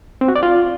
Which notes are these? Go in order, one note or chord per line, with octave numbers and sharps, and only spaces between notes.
C4
F#4
D5
F4